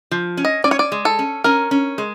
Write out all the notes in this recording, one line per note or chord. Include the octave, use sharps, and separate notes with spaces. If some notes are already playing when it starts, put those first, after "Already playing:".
F3
C#4
D#5
C#4 D5
C#5
D5
G#3
A4
C#4
C#4 A#4
C#4
G#3